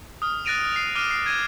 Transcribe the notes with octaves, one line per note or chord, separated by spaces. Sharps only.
D#6 F6
F#6 A6 A#6 D7 D#7 F7
C7 F7
D6 F6 C7 D#7
C7
G#6 A#6 D#7 E7